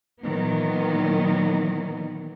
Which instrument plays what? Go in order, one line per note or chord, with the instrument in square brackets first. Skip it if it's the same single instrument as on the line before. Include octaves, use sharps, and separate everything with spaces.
[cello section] A#2 D#3 E3 F#3 B3